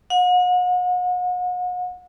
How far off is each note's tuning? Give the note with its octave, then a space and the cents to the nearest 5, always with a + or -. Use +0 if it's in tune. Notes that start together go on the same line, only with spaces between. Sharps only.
F#5 -40